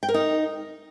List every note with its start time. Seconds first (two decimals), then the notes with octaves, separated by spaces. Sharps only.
0.03 G5
0.09 A#4
0.14 D#4